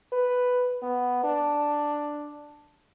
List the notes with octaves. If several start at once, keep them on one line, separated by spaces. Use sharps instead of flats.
B4
B3
D4